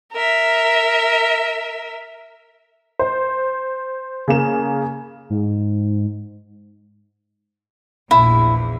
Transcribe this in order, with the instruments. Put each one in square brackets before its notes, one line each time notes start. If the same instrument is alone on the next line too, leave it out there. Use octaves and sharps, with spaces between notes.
[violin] A#4 E5
[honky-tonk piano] C5
C#3 A#3 E7
[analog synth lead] G#2
[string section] A#1 E2 [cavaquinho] E4